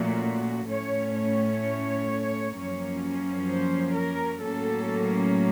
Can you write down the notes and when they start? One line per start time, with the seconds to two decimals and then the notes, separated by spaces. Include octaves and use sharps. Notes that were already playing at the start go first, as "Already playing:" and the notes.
Already playing: A#2 F3 A3 C#4 F#4
0.67 A2 A3 C#4 C#5
1.14 C#5
2.55 F#2 F3 A#3 C#4
3.49 C5
3.96 A#4
4.42 A2 F#3 A#3 C#4 A4